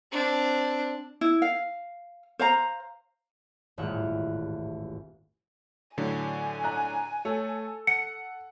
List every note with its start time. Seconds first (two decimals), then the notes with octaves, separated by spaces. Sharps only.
0.12 C4 D4
1.21 E4
1.42 F5
2.39 C5 F5 A#5
3.78 D#1 A1 G#2 E5 F#5 F6
5.97 A2 D3 F#3 G#5
6.64 A#5 F#6
7.25 A3 A4 C#5
7.87 F#5 C#7